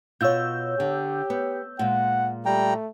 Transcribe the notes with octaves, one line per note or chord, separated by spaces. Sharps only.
B2 F4 C#5 E6 G6
D3 G4
B3
A#2 G#3 F#5
G3 A3 G5 A#5